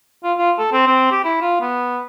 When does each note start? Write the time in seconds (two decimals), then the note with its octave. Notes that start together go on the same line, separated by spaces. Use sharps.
0.24 F4
0.38 F4
0.58 A4
0.73 C4
0.86 C4
1.11 G4
1.24 E4
1.41 F4
1.61 B3